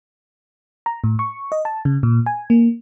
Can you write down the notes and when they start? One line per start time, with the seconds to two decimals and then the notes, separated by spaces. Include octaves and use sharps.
0.86 A#5
1.04 A2
1.19 C#6
1.52 D#5
1.65 A5
1.85 C#3
2.03 A#2
2.26 G#5
2.50 A#3